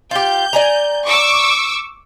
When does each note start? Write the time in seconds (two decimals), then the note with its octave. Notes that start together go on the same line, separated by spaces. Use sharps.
0.11 F4 G4 G6
0.53 D5 G#5 A#5
1.07 C#6 D6 E6